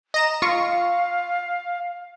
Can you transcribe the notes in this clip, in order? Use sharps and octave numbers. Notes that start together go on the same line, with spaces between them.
D#5 A#5 E7
F4 F5 C#6